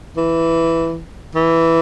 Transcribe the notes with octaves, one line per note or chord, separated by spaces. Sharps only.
E3
E3